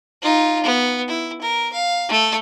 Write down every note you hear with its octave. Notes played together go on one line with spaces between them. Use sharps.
D#4 F4
B3
E4
A#4
F5
A3 A4